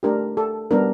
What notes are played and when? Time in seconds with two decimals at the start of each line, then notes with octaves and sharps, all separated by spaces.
0.03 A3 D4 G4 A#4
0.37 A4
0.71 G3 B3 D4 A#4